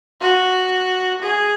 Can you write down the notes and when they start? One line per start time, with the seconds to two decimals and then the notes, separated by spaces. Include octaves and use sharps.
0.21 F#4
1.22 G#4